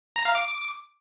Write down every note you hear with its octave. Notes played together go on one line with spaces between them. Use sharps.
A#5
F5
D6